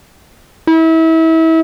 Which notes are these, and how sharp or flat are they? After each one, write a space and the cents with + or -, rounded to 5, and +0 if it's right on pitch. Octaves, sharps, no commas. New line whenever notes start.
E4 -30